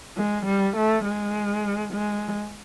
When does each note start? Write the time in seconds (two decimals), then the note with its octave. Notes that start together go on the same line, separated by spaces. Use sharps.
0.17 G#3
0.45 G3
0.76 A3
1.04 G#3
1.93 G#3